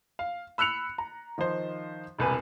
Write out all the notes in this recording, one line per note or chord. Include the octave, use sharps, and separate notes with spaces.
F5
B5 E6 F#6 C#7 F7
A#5
D#3 F3 D#4 C5
E1 C2 B4 G#5